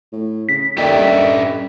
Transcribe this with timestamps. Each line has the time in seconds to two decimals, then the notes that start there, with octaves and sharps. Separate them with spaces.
0.13 A2
0.49 C#3 B6
0.78 D#2 D#3 C#4 A4 D5 E5 G5
0.99 G2